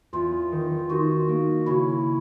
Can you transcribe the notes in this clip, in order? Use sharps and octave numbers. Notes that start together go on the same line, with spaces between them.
E2 F4
D#3
D#4 F#4
A#3
C#3 E4